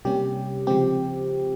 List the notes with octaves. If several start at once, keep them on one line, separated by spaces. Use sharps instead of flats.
C3 G3 A#3 C#4 G4
C#3 F3 G#3 C4 G4